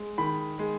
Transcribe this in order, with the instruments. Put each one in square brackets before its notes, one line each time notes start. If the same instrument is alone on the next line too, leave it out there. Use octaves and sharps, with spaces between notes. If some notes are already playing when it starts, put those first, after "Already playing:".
Already playing: [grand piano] G#3
D#3 B5
G#3